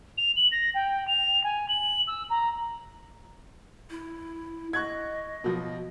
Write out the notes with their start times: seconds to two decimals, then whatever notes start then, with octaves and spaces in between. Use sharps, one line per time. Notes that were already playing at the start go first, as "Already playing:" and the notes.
0.17 F7
0.36 F#7
0.51 A#6
0.74 G5
1.08 F7
1.44 G#5
1.68 F#7
2.07 E6
2.30 A#5
3.91 E4
4.73 D#5 C#6 F#6 G#6
5.44 B2 F3 F#3